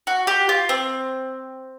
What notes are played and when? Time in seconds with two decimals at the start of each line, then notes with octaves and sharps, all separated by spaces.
0.07 F#4
0.27 G4
0.49 F4
0.69 C4